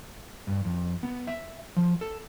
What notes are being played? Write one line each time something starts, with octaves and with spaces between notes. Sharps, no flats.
G2
F2
B3
E5
F3
A4